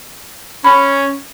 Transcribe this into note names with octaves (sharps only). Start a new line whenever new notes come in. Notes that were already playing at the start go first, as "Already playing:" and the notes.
C#4 B5